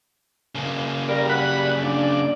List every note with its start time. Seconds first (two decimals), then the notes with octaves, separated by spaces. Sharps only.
0.55 C#3 A#3
1.09 G3 A#4
1.29 F#5 B5
1.83 D4 D5